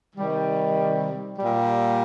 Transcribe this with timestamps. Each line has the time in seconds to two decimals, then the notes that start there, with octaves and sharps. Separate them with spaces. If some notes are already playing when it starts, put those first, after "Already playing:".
0.15 C3 D#3 G3
1.36 A#2 G3